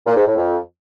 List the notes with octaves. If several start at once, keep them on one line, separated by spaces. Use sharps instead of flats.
A#2
G#2
A2
F2